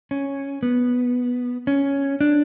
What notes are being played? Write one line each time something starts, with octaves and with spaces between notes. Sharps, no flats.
C#4
B3
C#4
D4